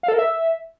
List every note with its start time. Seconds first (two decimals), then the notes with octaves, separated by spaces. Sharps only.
0.03 F5
0.08 A4
0.14 A#4
0.19 E5